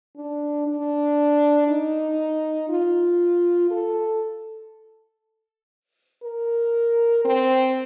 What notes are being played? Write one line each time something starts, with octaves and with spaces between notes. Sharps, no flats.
D4
D4
D#4
F4
A4
A#4
C4